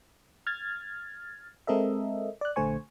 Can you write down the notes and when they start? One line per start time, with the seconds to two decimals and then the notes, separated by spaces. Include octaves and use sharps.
0.47 F6 G#6 A6
1.67 G#3 C4 A4 A#4 D#5 E5
2.41 D5 F#6
2.56 A#1 D3 A3 C5 G#5 C#6